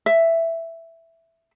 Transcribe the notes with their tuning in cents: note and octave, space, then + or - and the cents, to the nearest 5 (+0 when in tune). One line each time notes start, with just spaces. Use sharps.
E5 +5